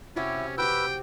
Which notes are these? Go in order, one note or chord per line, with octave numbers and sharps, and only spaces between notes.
C3 C#4 E4 F#4 G4
F#4 G4 B4 G5 E6